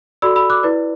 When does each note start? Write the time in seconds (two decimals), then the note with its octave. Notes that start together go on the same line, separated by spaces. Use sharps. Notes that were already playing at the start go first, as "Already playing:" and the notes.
0.22 F#4 A4 D5 B5 E6
0.36 B5 E6
0.50 D6 F#6
0.63 E4 B4 D5